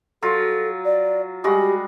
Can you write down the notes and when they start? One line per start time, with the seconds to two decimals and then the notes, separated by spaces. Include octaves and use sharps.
0.22 F#3 F4 A4
0.85 D5
1.44 G3 G#3 F#4 G4